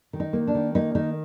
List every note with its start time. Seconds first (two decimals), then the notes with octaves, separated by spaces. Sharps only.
0.13 D#3
0.20 D#4
0.33 A#3
0.47 D4
0.55 D#3
0.75 A#3 D#4
0.95 D#3 D#4